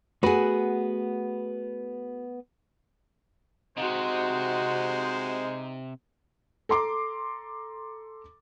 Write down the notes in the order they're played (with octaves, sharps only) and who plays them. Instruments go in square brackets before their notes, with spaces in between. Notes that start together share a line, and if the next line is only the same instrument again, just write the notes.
[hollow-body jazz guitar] A3 B3 B4 [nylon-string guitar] F#4 G#4
[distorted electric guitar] C3 [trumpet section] G#3 C5 [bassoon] D#4 [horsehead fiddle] F#4
[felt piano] A4 A#5 C6 D6